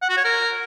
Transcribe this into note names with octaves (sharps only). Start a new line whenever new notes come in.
F#5
F#4
C#5
A#4